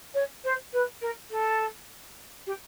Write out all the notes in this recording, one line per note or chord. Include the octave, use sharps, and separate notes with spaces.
C#5
C5
B4
A#4
A4
G4